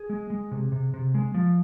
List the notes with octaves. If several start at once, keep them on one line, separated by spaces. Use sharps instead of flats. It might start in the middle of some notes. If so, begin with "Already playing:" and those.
Already playing: G#4
G#3
G#3
C3
C3
C3
G#3
F3